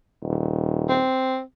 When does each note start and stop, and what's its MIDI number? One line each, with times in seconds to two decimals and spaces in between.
0.23 1.01 27
0.89 1.41 60